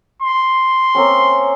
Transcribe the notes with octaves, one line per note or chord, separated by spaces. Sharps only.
C6
A#3 C4 C#4